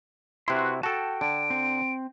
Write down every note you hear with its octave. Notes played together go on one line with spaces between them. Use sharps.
C3 E4 F#4 B4 C6
F#4 A4 G5 A5
D3 D7
C4